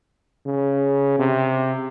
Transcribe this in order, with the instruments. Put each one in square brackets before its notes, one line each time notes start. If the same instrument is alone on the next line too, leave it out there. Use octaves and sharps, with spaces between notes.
[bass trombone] C#3
C3